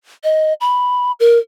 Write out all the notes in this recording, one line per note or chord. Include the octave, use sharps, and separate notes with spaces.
D#5
B5
A#4